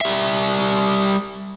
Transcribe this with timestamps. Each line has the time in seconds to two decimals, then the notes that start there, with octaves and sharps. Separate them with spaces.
0.01 G3 E5